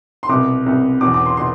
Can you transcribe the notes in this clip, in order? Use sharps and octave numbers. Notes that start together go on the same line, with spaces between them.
C6
C2 B2 D6
C2 B2
E2 B2 D6
D6
C6
B2 C6